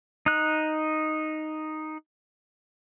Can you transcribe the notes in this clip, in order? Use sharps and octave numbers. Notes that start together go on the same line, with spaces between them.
D#4 F#6